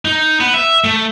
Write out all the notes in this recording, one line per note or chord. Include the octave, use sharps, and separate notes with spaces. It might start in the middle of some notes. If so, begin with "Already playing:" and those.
D#4
B3
E5
A3